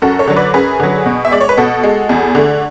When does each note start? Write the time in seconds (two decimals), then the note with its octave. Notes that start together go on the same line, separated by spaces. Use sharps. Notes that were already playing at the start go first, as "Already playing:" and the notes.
0.02 F#2 F#4 A4
0.19 A4 C#5
0.28 D3 F#3
0.36 B4 D5
0.54 F#2 G#4 B4
0.80 D3 F#3
1.06 B2
1.25 E5
1.31 G#3 D5
1.41 C#5
1.49 B4
1.57 B2 F#4 A4
1.83 G#3
2.09 E2
2.35 D3 A3